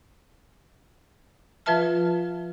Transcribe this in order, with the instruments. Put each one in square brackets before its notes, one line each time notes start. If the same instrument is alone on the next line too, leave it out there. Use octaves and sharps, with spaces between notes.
[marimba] F3 F4 B4 E5 A5 F6